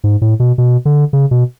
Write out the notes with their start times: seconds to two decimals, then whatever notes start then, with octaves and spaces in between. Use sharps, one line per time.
0.04 G#2
0.22 A2
0.40 B2
0.58 B2
0.85 D3
1.13 C#3
1.31 B2